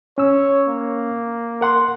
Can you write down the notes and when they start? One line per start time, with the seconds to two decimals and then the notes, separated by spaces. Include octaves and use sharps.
0.18 C#4 C#5 E6
0.68 A#3
1.61 A#4 F#5 C6